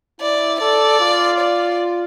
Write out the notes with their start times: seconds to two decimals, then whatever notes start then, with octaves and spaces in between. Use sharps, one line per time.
0.21 E4 D5
0.60 A4 D5
1.01 F4
1.40 D5